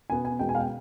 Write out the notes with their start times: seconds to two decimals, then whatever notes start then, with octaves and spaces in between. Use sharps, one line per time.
0.10 B2 B3 G#5
0.25 G#5
0.39 B2 G#3 B3 G5
0.49 G#5
0.55 F5
0.59 G5